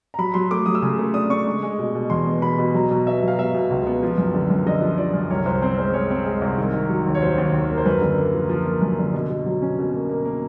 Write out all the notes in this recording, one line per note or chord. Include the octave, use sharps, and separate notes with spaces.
A#5
F#3 B5
F#3 C6
A3 D6
F#3 D#6
E6
C#3 D#6
A3
D4 D#6
D4 C#6
G#3
G#3
B2
B2
E2 C6
B3
B2 B5
B2
F#3 A#5
B2
B3 E5
F#3
F5
B2 E5
B2
C#2
B3
F3
F#2
D3
F#2
D3 D#5
F3
F3 D5
F#2
C2 C#5
C2 C5
C4 C5
G#3 C5
G#3 C#5
C4
G#3
C2
D#3
D#3
F#3
D#2
C#5
F#3 C5
D#2
D#2
A#3
C5
F#2 B4
D3
A#3
F3
F3
A#3
F#2
D3
B2
B2
F#3
C#4
B2
A#3
A#3
A#3